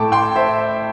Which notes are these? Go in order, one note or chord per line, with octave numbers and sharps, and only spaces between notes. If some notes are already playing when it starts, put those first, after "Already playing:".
Already playing: A2 A3 E4 G5 A5 D6
G5 C6
C5 E5